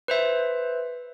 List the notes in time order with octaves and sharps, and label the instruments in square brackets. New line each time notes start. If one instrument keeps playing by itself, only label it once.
[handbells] B4 C5 E5